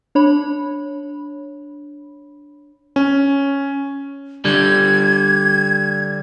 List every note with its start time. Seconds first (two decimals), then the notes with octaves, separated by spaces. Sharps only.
0.15 D4 C#5 B5
2.96 C#4
4.45 D3 G3 G#6